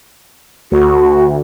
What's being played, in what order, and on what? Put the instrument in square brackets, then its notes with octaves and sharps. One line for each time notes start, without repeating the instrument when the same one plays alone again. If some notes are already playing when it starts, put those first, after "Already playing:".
[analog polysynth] D2 [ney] F#4